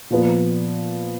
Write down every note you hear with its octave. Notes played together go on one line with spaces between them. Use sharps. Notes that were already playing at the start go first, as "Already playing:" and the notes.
A#2 F3 B3